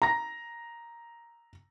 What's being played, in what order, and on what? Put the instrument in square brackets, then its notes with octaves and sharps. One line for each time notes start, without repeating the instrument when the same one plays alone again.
[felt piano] A#5 A#6